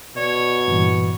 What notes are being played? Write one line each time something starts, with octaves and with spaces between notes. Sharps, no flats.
B2 C#5 D5
G2 A#2 E3